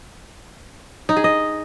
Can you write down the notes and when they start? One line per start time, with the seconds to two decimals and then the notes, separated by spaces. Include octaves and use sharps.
1.09 D#4
1.17 G#4
1.24 D#5